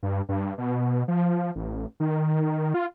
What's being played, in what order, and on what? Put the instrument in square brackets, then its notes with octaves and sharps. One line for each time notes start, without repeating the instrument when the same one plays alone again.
[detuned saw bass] G2
G2
B2
F3
A1
D#3
F4